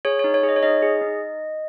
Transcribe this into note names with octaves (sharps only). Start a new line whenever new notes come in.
G#4 C#5
D#4 C#5
C#5
G#4
D#5
C#5
D#4 D#5
G#4
D#4